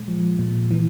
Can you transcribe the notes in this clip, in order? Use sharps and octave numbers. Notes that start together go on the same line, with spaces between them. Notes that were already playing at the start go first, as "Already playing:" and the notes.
Already playing: A#2 G#3
F3
A#2
E3